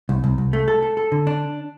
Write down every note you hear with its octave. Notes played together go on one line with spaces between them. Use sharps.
C2
C2
C2
A3
A4
A4
A4
D3
D4